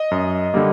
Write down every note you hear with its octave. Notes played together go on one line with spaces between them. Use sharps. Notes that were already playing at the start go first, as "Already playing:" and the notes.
Already playing: D#5
F#2
D3 G3 A#3